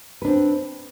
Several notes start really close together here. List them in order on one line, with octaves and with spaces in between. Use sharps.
B4 D4 C4